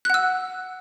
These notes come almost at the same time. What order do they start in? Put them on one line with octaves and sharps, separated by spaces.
F#6 F#5 E6